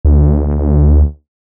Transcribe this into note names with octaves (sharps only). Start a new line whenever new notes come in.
D2